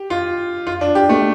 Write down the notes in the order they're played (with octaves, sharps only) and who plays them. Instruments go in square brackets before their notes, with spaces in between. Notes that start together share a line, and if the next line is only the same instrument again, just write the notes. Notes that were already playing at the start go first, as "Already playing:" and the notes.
Already playing: [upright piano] G4
F4
F4
D4
G4
A3